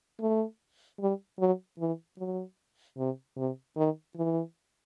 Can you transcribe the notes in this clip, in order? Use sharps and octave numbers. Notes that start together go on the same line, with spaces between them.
A3
G3
F#3
E3
F#3
C3
C3
D#3
E3